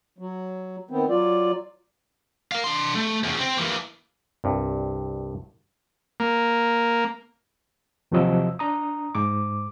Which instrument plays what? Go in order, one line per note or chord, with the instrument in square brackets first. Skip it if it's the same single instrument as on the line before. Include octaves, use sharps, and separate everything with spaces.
[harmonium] F#3
D#3 B3 C4
F#3 F4 D5
[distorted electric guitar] A#4 F5
D4 C6
A3
E2 C#3
C4
E3 A#3
[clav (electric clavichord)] C2 G2
[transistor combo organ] A#3
[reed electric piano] D#2 C3 F3 F#3 D#5 E6
D4 A#5 D#6
G#2 D6